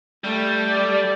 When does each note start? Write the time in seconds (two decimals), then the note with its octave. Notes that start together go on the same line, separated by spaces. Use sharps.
0.24 G3 A3
0.68 A4 D5